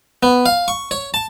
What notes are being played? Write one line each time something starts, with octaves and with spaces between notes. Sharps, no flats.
B3
F5
C#6
C#5
A5